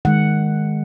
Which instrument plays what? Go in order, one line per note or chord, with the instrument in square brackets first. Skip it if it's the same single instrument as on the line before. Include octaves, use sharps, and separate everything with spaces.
[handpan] D#3 G#3 F#5